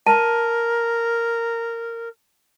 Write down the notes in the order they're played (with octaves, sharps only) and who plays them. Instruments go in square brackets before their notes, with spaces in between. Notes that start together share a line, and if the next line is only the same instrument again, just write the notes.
[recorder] A#4 [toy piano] A5